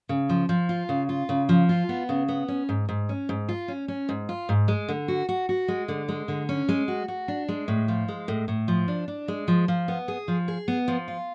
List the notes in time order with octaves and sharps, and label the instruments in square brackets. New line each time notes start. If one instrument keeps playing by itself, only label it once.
[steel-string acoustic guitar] C#3
F3
F3
F4
C#3
F4
C#3
F3
F4
B3
C#3
B3
C#4
G#2
G#2
C#4
G#2
F4
C#4
C#4
G#2
F4
G#2
G#3
D3
F#4
F#4
F#4
G#3
D3
G#3
D3
C#4
G#3
F#4
F#4
D4
G#3
A2
F3
G#3
A2
A2
F3
D4
D4
G#3
F3
F3
B3
G#4
F3
G#4
B3
F3
F4